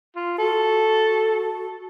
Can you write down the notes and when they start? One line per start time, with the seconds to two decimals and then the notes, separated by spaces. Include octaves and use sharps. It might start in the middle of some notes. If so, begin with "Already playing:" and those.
0.16 F4
0.38 F#4 A4